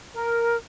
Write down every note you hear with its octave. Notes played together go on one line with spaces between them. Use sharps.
A#4